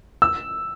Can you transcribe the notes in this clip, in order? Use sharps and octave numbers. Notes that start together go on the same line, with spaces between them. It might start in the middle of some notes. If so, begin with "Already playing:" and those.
E6